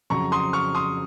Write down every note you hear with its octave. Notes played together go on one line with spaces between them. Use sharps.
F2 C#3 F#3 A#5 C#6
C6 D#6
C#6 F6
C6 D#6